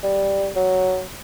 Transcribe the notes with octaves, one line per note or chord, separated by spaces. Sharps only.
G3
F#3